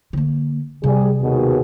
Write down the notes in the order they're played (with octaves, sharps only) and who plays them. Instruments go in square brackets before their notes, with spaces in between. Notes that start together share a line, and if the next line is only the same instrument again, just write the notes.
[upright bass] D3 A#3
[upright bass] C3 [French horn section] G3 G#4
[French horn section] D#2 B2 G#4